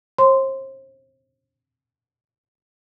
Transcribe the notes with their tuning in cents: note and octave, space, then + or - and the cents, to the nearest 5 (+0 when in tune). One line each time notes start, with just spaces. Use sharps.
C5 +40 C6 -10